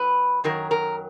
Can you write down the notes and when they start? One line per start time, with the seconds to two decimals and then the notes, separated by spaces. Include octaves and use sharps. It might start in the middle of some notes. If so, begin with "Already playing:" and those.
Already playing: F#3 B4
0.44 F#2 D#3 F#3 A#4
0.71 A#4